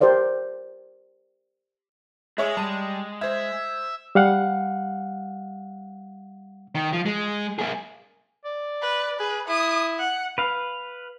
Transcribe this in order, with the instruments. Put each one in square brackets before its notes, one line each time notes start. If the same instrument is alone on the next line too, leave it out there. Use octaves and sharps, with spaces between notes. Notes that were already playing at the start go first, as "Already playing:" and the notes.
[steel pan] G4 A#4 C5 D5 F5
[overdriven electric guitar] G#3 [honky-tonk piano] G#4 C#5 E5
[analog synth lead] G3 [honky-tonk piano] A5 D#7
[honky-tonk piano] C5 G#6 [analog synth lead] E5
[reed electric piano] G3 F5 F#5
[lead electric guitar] D#3
F3
G#3
A#3 G#4
[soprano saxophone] D5
[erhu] B4
[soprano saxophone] G#4 [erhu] B4
[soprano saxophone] E4 [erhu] D#6
[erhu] F#5
[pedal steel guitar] B4 F5